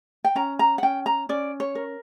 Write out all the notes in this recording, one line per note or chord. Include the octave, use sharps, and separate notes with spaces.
G5
C#4 A#5
A#5
F#5
C#4 G5
A#5
C#4 D5
C#5
A#4